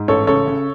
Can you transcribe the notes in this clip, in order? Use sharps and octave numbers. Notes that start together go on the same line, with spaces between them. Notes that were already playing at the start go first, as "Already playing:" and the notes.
Already playing: G#2
A1 A4 C#5
C#3 A4 C#5
C#3